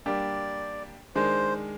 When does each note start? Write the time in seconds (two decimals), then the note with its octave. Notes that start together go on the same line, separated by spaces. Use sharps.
0.06 G3 A#3 D4 G4 D5
1.15 D#3 G#3 D4 C5